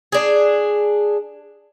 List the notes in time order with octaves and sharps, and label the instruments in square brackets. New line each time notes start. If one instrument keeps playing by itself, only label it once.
[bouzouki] D4 G#4